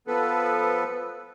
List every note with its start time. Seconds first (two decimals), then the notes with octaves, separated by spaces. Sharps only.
0.07 F3 B3 A4 B4